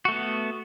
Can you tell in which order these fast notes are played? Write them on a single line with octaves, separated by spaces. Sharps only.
F#4 A3 B3